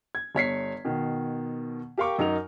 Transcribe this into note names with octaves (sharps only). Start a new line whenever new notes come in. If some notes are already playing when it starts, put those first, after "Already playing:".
G#6
G1 C#5 B6 C7
B2 D#3
G4 A#4 F5 G5 C#6 D6
F#2 D#4 A#4 F7